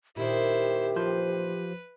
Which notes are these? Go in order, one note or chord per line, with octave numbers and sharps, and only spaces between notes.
A#2 D#3 E4 G4 C5
F3 B4 C5